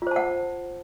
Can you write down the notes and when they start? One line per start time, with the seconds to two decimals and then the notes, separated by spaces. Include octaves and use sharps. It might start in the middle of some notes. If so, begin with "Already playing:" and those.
0.02 F4
0.07 C5
0.11 A5
0.16 F#5